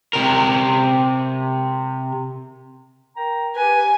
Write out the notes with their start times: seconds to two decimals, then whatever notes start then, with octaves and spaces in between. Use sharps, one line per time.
0.13 C3 A#4
3.17 A#4 G5 A#5
3.56 G4 B4 G#5